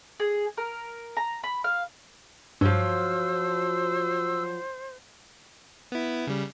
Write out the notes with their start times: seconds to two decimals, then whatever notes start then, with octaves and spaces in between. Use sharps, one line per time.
0.20 G#4
0.58 A#4
1.17 A#5
1.44 B5
1.64 F5
2.61 G2 F3 F#3 C5 E6
5.92 B3 E4
6.27 C#3 G3